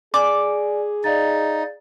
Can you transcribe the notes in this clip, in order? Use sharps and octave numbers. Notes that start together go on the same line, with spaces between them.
G#4 D5 G#5 D6
D#4 D5 F5 A6